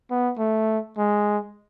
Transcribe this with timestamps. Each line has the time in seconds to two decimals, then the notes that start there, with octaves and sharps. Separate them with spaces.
0.10 B3
0.38 A3
0.98 G#3